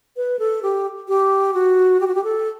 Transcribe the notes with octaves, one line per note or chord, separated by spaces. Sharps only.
B4
A4
G4
G4
F#4
G4
F#4
G4
A4